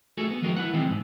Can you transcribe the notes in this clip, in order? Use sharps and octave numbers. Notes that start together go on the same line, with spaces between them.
A3 F#4 G#4 A4
B3
D#3 F3 G#3 F#4 G#4 A#4
E4 B4 F#5
D#3 E3 G3 G#3 C4
G#2